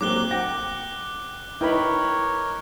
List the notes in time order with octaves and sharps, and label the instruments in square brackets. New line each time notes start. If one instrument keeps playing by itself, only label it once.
[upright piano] F#3 A#3 C4 [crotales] D6 F#6 G7
[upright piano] F#5 G5 A#6
[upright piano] D#4 G5 [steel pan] E4 B4 B5 [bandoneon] A#4 C#5